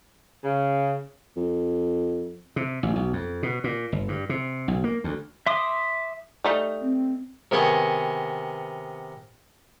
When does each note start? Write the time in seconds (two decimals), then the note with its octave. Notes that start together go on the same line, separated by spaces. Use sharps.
0.44 C#3
1.37 F2
2.56 C3
2.83 A1
2.96 B1
3.13 F2
3.43 B2
3.64 A#2
3.92 G1
4.08 G2
4.29 C3
4.68 B1
4.84 A#3
5.04 D2
5.46 E5 C6 D6 D#6
6.44 G3 A3 D#4
6.81 C4
7.51 C3 D#3 B3 G#4 D#5 C#6